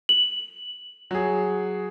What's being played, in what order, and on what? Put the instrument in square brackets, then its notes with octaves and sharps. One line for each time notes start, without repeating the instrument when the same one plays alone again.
[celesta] F#7
[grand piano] F#3 G#4